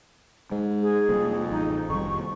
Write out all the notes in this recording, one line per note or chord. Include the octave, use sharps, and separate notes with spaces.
G#2 G#3
G#4
F2 C3 G3 A#3
A1 D#4
F1 F2 D#3 G3 C#6